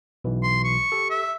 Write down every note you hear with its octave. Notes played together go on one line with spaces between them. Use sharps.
B1 B2 E3
C6
C#6
G4 A4
E5